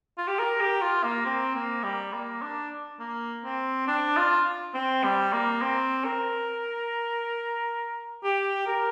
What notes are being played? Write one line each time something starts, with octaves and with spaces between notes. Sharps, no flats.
F4
G4
A#4
G4
F4
A#3
C4
A#3
G3
A#3
D4
A#3
C4
D4
F4
C4
G3
A#3
C4
A#4
G4
A#4